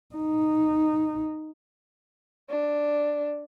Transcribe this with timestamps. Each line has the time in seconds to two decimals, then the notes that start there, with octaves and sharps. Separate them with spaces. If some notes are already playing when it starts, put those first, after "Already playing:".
0.15 D#4
2.50 D4